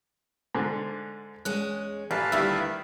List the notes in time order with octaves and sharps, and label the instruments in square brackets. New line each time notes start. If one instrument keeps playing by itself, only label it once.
[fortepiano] G#2 D3
[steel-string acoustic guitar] E2 G#3 C#4 [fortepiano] F#6
[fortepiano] A1 [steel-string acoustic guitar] A4 [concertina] B4 F5 A5
[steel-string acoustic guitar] D2 A#3 E4 [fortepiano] D#3 G3 E5